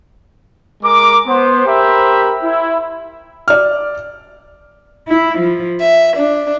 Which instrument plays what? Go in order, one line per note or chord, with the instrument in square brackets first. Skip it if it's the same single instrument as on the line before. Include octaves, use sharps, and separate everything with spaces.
[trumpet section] G#3 A#4 D6
B3 C5
G4 A#4 C5 E5 B5
E4
[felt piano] D5 F6
[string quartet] E4
F3
E5
D4